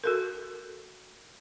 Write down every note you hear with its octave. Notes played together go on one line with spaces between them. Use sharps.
F#4 A4 A#4